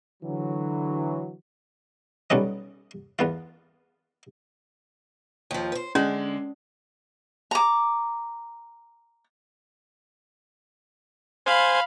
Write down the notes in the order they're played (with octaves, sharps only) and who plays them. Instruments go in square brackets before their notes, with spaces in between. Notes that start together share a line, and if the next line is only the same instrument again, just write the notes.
[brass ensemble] D3 E3 F#3
[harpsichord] B1 G3 B3 C#4 D#5
E2 B3 F4
[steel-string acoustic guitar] D#2 F3
B4 C5
[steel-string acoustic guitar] D3 [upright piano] G#3 [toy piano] C#4
[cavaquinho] A#5 D6
[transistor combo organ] C5 G#5 [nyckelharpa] F5 B5